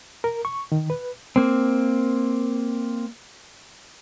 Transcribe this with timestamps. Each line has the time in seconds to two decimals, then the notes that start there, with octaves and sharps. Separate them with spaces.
0.24 A#4
0.45 C#6
0.72 D#3
0.90 B4
1.36 A#3 C4